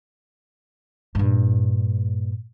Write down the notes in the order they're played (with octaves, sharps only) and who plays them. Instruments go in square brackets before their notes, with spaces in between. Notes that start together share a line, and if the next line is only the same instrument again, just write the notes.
[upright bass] G2 A#2